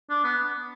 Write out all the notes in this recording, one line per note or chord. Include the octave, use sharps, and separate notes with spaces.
D4
B3